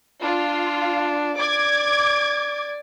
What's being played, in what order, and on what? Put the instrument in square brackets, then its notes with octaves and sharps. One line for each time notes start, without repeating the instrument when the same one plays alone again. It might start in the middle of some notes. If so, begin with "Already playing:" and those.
[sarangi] D4 [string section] F4
[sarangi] D5 [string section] D6 G#6